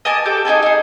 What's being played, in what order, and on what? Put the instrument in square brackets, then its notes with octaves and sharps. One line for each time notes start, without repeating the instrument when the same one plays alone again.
[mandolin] D#5 G#5 A5 D6
G4 A4 D6
D#4 F#4 G#4 A4
D#4 G#4